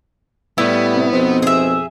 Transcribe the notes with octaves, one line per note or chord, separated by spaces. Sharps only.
A2 G3 B3 E4
C3
F2 B2 C4 D#4
G#4 E5